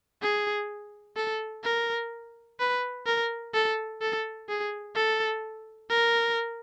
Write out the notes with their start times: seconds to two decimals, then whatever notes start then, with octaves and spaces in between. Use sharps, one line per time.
0.22 G#4
1.17 A4
1.64 A#4
2.60 B4
3.06 A#4
3.54 A4
4.01 A4
4.49 G#4
4.95 A4
5.90 A#4